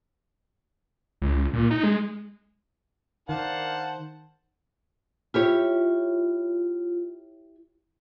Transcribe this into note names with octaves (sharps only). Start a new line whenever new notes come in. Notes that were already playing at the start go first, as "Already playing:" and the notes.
C#2
A#2
D#4
G#3
D#3 D4 A#4 C5 F5 F#5 A5
E4 F4 G4 C#5